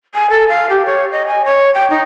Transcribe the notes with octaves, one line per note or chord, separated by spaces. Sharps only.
G#5
A4
F5
G4
C#5
D#5
G#5
C#5
G5
D#4